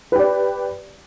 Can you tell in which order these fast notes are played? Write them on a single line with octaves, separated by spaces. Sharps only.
B4 G4 D5